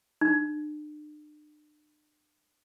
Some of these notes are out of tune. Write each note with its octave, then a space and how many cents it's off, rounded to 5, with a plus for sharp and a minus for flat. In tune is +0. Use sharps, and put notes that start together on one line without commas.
D4 +40